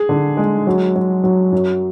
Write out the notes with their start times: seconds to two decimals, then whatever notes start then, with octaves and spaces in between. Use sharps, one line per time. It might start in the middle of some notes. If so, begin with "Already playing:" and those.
Already playing: G#4
0.09 D3
0.37 G#3
0.67 F#3
0.96 F#3
1.24 F#3
1.52 F#2